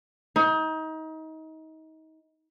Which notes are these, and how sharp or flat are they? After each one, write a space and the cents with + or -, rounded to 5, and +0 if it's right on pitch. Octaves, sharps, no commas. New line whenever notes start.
D#4 +30